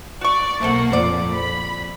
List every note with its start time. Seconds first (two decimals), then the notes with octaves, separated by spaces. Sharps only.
0.21 F#4 D5 C#6
0.61 B1 A3 A#3 C4 A4 F#5
0.92 F2 A#2 C5 D5
1.34 B5